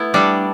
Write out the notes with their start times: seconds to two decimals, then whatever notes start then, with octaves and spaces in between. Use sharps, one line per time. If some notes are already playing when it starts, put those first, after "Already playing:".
Already playing: A3 B3 E4
0.14 G3 D4 A4